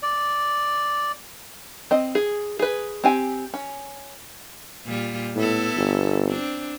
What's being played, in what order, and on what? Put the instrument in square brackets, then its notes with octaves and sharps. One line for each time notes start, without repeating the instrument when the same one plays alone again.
[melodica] D5
[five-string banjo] C4 D#5
G#4
G#4 B4
C4 G4 G#5
C#4
[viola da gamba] A#2 G3 F4
[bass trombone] A2 [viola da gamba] B3 E4 A4
[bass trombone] G1
[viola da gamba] C4 D4